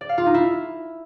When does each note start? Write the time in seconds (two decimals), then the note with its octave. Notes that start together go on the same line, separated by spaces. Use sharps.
0.01 D5
0.09 F5
0.18 F4
0.26 D#4
0.34 E4